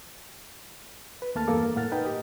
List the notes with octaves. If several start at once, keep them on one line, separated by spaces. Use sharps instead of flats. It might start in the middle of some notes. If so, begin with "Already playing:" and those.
B4
D#2 A3 A#3 A5 F6 A6
E2 G2 A#3 A4 A#4 D6
A2 A#3 F#5 F6 A6
D#4 A#4 B4 G5
G4 D#5